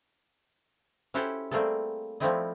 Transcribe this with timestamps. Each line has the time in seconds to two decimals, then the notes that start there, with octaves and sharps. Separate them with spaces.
1.14 C#4 E4 F#4 G4 A4 C5
1.51 G3 A3 A#3 C4 G#4 A4
2.20 F3 G3 A3 C4 E4 D#5